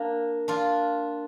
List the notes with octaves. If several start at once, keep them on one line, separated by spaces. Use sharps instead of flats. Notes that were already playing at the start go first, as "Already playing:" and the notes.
Already playing: A#3 D4
D4 F4